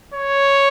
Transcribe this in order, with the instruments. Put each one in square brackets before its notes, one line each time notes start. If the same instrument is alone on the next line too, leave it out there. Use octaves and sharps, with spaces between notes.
[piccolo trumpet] C#5